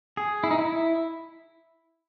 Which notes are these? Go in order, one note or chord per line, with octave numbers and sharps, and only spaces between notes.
G#4
E4
D#4
E4